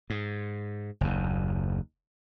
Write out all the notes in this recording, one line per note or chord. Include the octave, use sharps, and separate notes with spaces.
G#2
F#1 D#2